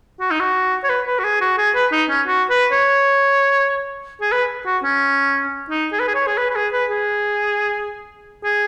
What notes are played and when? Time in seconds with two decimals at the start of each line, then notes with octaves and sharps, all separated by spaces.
0.21 F#4
0.31 D#4
0.40 F#4
0.84 C#5
0.90 B4
1.07 B4
1.19 F#4
1.24 G#4
1.41 F#4
1.58 G#4
1.75 B4
1.92 D#4
2.09 C#4
2.28 F#4
2.50 B4
2.72 C#5
4.21 G#4
4.32 B4
4.66 F#4
4.83 C#4
5.70 D#4
5.93 G#4
6.00 B4
6.08 G#4
6.15 C#5
6.27 G#4
6.38 B4
6.50 B4
6.56 G#4
6.73 B4
6.90 G#4
8.44 G#4